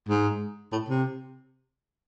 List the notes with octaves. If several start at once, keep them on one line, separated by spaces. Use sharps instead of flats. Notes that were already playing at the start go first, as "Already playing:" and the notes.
G#2
A2
C3